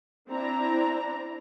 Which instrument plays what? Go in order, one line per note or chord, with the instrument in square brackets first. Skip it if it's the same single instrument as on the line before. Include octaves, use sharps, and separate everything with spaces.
[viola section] C4 D4 E4 A#5